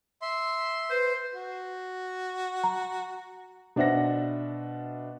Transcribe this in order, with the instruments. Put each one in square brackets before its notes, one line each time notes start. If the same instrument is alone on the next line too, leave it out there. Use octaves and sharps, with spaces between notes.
[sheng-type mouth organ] E5 C6
[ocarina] B4 [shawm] C5
[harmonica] F#4
[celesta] A#5
[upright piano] B2 D4 C5 E5 F#5 A#6